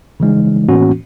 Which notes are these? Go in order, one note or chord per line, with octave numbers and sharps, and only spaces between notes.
C#3 E3 G#3 D#4
A2 E3 A#3 B3 C#4 F#4